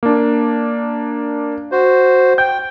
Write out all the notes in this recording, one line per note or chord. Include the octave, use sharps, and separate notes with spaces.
A#3 D4
F#4 C5
G5 G6